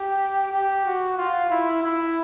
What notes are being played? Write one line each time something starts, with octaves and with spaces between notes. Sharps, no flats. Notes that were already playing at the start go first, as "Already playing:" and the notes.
Already playing: G4
G4
F#4
F4
E4
E4